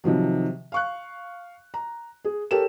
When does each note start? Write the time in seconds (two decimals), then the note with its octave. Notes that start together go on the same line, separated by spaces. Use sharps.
0.04 C3 D#3 F3 F#3
0.72 F5 C#6 F#6
1.74 A#5
2.24 G#4
2.51 G4 A4 A#4 C#5 E7